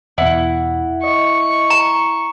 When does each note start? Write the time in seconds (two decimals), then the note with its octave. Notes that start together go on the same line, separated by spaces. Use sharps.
0.18 E2 B2 E4 F#5
1.04 D#5 C#6
1.70 A#5